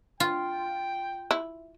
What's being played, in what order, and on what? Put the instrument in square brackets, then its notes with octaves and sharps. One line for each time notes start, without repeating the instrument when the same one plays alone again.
[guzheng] F4 [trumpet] G5
[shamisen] E4